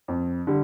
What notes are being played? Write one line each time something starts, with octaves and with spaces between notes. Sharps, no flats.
F2
D3 G3